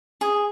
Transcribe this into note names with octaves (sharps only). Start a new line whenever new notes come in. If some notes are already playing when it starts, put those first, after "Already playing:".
G#4